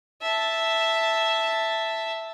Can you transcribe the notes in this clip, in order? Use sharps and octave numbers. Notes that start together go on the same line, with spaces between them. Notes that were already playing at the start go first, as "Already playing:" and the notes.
E5 A5